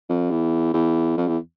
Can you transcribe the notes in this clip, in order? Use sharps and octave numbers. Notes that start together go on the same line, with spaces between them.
F2
E2
E2
F2
E2